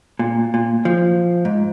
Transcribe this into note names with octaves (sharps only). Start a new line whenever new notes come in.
A#2
A#2
F3
G#2